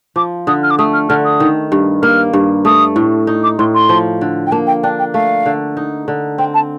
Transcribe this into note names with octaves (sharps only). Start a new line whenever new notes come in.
F3 D6
D3 D#6
F6
D6
A3 D#6
F6
D3 F6
D#6
D#3
G2
A#3 F6
G2
A3 D#6
A2
D#4
D6
A2 C6
C6
F3
D3
G5
A#3 A5
G5
D4 G5
G5
A3 F5
D3
D#4
D3
C4 G5
A5